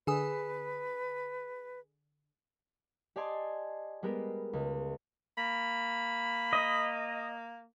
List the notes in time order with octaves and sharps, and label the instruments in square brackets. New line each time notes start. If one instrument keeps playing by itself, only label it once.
[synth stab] D3 [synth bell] G#4 G#5 D#6 [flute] B4
[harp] G4 D5 D#5 G#5 A5 C6
G3 G#3 B3 G4 A#4
C#2
[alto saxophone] A#3 [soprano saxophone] B5
[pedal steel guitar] D#5